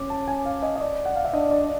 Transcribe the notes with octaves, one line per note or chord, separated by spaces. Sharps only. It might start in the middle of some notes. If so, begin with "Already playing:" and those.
Already playing: C#4 D6
A5
G#5
F5
D#5
D#5
D5
F#5
F5
E5
D4 D#5
D5